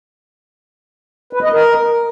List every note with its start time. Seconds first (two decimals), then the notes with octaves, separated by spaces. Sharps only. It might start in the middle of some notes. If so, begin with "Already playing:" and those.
1.33 B4
1.43 D#5
1.52 A#4